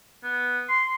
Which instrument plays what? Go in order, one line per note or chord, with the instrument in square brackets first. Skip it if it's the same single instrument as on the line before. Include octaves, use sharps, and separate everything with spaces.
[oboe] B3
C6